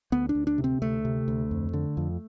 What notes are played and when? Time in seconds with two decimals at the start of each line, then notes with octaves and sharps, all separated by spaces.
0.12 D2 B3
0.29 D4
0.35 D2
0.47 D4
0.58 C3
0.64 C4
0.82 D2 A3
1.05 C3
1.28 D2
1.51 F2
1.73 D3
1.97 F2